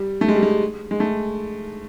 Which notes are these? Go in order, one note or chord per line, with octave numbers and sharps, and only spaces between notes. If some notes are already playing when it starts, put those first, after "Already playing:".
Already playing: G3
A3
G#3
G3
G#3
G#3
A3